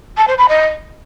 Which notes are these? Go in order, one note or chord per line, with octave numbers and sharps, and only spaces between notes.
A5
C5
B5
D#5